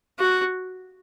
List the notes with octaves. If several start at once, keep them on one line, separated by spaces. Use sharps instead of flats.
F#4